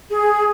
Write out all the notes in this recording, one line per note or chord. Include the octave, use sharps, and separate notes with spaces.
G#4